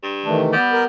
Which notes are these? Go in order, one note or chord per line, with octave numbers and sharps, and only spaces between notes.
G2
D#3 E3 A3 D4
C3
G3 B3
A#4